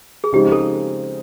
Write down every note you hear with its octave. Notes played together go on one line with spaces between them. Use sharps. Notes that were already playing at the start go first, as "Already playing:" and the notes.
G#4
C#3 F3 G#3 C4 D#4 G4
A4